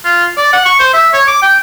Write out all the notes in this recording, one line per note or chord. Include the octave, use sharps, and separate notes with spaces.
F4
D5
F#5
C#6
C5
E5
C#5
D6
G5